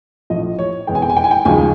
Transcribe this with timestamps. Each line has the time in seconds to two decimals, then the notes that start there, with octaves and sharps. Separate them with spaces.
0.30 A#1 A2 F3 D#5
0.59 C#5
0.87 F1 E2 B2 G#3 G5
0.95 G#5
1.02 G5
1.10 G#5
1.17 G5
1.24 G#5
1.31 G5
1.45 D#2 C#3 F3 G#3 G#5